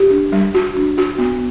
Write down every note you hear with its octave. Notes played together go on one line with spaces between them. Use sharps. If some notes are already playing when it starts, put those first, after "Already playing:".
Already playing: G4
D4
G3
F#4
D4
F#4
B3